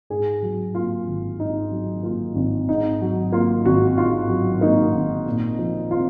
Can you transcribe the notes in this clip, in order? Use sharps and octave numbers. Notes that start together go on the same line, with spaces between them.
G#2 G#4
F#3
A#3 F4
G#1
G#2 D#4
F#3
A#3 F4
G#1
G#2 D#4
F#3
A#3 F4
G#1 F#4
G#2 F4
F#3
A#3 D#4
G#1
A#2
F3
C4 F4